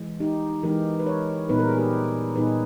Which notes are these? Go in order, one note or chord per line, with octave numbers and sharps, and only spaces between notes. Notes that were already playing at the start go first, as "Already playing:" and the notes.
Already playing: E3 G#3
D#4 G4
E3 G#3 D#4 G4 A#4
B4
A#4 C#5
A#2 G3 B3 D#4 B4
A#4
G#4
G4 A#4
A#2 G3 B3 D#4 G#4 B4
B4